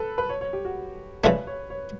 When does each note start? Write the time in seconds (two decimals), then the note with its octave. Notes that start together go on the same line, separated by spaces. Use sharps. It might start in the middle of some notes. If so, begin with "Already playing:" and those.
Already playing: A4 B4
0.18 B4
0.29 C#5
0.41 C#5
0.53 G4
0.65 F#4
1.23 C#3 E3 A3 D4 B4
1.47 C#5
1.70 C#5